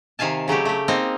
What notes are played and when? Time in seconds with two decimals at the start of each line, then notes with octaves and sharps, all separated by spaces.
0.19 C3 D#3 F5 G#5 A5
0.48 C#3 F#3 A3 G4
0.65 A3 G4
0.88 A#3 C4 D#4